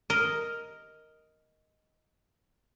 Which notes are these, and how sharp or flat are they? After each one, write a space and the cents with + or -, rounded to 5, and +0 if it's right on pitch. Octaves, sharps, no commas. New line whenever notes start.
A#4 +0 D#5 +5